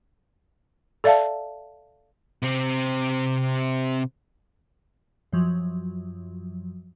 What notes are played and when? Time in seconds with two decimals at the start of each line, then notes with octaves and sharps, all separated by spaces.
1.04 A4 D5 E5 F5 A5
2.42 C3 C4
5.32 F#2 F3 F#3